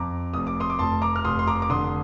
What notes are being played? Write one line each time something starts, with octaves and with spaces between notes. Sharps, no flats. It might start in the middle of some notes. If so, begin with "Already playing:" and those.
Already playing: F2 A#5 D6
F1 D#6
D6
C6 D#6
D6
F1 A5 C6
A#5 D6
F6
F1 C6 D#6
C6
A#5 D6
D6
D3 C6 D#6